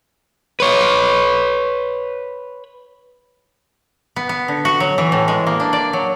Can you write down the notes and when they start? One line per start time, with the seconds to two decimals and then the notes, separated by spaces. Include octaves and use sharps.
0.60 B4 C#5
4.16 B3
4.29 B3
4.48 D3
4.65 F#4
4.80 F#3
4.98 E3
5.12 A2
5.28 G#3
5.47 A#3
5.60 D4
5.73 D5
5.93 F#3